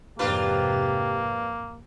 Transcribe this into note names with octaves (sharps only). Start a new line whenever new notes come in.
F2 G#2 C3 A#3 D4 F4 G4 B4